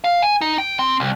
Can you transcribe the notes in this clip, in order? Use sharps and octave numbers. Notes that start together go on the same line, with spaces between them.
F5
G#5
D#4
G5
C4
C2